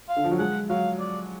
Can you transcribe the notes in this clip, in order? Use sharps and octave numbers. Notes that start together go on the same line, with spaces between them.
F5
D3
F3
F#3
G#3 F#5
F#3 F5
D5